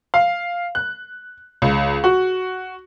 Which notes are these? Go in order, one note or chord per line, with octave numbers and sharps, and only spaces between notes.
F5
F#6
C#2
F#4